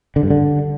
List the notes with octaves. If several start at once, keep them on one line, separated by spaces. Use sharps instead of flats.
D3
G2
D3